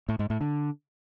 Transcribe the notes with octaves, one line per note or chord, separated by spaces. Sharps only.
A2
G#2
A2
D3